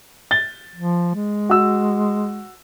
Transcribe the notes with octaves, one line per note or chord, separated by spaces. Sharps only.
A6 G7
F3
G#3
F#4 E6